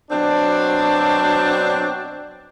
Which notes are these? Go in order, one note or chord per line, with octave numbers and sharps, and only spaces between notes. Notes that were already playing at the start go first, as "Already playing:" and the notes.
B2 F#3 C4 D4